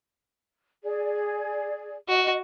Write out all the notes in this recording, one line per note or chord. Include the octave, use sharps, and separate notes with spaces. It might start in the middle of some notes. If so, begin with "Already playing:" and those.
G#4 D5
F#4 D#5